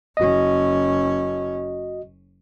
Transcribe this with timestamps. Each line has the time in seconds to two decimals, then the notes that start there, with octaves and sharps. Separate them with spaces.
0.17 F#1 C#4 F#4 D#5